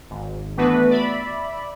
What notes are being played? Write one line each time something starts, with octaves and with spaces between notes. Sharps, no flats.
G#1
E3 A3 B3 D4 F#4 B4
D5 E5 B5